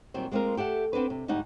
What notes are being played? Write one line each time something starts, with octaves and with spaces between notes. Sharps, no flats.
A#2 D#3 F#3 G3 C4
G#3 A#3 C4 C#4 F4 A#4
G4 A4 E5 F#5
B3 C4 D4 B4
C3
D2 G#2 G3 D#4 F#5